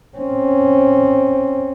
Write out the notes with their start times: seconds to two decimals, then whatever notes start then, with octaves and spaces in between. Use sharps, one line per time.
0.17 C4 C#4